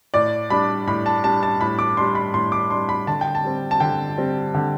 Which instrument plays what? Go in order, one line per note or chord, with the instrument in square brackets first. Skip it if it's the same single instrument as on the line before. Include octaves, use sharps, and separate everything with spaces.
[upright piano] A2 D5
G3 D4 B5
A2 B5
A5
G3 D4 A5
A5
A2 B5
D6
G3 D4 C6
B5
A2 C6
D6
G3 D4 C6
B5
D3 A5
G5
A5
G3 C4
A5
D3 G5
G3 C4
D3